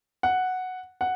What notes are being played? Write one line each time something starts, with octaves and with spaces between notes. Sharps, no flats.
F#5
F#5